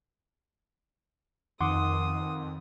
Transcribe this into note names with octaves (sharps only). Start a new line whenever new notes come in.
F2 D#3 D#4 F#5 C6 D6 D#6